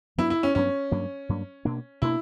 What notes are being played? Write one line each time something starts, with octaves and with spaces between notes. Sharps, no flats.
G2 F#3 B3 D4 E4
E4
C#4
G2 F#3 B3 C#4 D4
G2 F#3 A#3 D4
G2 F#3 A#3 D4
B2 A#3 D4
B2 A#3 D4 E4